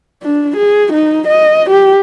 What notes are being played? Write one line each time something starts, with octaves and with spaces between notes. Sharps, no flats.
D4
G#4
D#4
D#5
G4